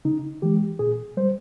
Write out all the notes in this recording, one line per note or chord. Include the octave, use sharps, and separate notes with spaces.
C#3 D#4
E3 G#3 G4
A#2 G#4
G3 C5